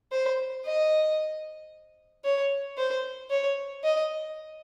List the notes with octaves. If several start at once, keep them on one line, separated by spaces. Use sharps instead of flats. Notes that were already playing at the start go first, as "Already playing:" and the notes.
C5
D#5
C#5
C5
C#5
D#5